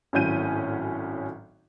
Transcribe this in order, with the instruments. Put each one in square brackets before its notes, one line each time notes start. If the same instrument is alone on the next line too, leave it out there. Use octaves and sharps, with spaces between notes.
[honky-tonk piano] G#1 A2 F#3 C#4 G6 D#7